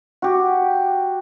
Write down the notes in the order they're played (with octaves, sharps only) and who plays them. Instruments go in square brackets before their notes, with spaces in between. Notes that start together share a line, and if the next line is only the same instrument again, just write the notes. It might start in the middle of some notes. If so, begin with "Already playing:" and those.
[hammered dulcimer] F#4 G4